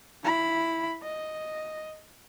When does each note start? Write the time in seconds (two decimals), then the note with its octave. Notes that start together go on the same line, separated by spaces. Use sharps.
0.23 E4 B5
1.02 D#5